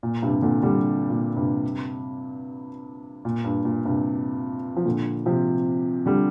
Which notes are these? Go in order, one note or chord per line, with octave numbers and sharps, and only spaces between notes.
A#2
G2 C3
A#2 D3
D3 G3
A#2
G2 C3
A#2
G2
A#2
G2 C3
F3
A#2 D3
C3 F3
D3 G3